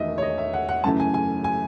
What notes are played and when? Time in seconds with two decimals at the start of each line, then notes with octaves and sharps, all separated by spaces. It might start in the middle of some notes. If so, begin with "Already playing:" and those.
Already playing: E1 E2 D#3 A3 D#5 E5
0.18 C#5
0.22 D#5
0.38 E5
0.53 F#5
0.69 F#5
0.84 F#2 C#3 E3 A3 A5
1.00 G#5
1.14 G#5
1.44 G#5